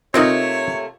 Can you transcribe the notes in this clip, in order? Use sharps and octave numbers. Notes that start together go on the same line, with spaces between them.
C3 A3 A#3 C4 D#4 F4 A#4 C#5